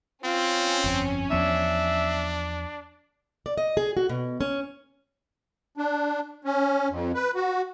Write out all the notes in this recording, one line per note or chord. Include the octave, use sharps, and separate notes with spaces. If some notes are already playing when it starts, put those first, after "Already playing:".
C4 C#4 F4
G1 F2
E2 F3 B3 D4 E5
D5
D#5
G#4
F#4
B2
C#4
D4
C#4
F2
B4
F#4